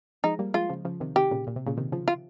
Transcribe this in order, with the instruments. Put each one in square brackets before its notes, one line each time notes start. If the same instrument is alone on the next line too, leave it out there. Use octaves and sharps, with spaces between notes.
[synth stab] F3 G#3 [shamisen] D#4
[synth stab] G3 A#3
[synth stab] F3 G#3 [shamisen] F4
[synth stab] C#3 F3
C#3 F3
C3 D#3
[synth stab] C3 D#3 [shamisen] G4
[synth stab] A#2 C#3
A#2
C3
A#2 C#3
C3 D#3
C#3 F3
[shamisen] F4